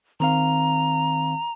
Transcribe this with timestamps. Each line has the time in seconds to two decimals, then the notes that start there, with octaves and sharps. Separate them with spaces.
0.20 D#3 C4 F5 A#5